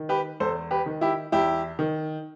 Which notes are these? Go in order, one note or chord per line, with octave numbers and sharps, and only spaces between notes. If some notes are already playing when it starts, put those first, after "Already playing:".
Already playing: D#3
G4 B4
E2 A4 C5
G4 B4
D#3
E4 G4
E2 E4 G4
D#3